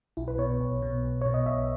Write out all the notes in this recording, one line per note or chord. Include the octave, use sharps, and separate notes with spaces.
B1 E4
B4
B2 C#5
B1
B2
B1
B2 C#5
D#5
B1 E5